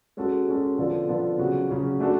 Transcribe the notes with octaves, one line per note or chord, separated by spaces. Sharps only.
G#3 C#4 F#4 A4
G#3 C#4 F#4 A4
D3 F3 B3 F4 A4
D3 F3 B3 F4 A4
C#3 F#3 C#4 F#4
C#3 F#3 C#4 F#4
A3 D4 F#4 A4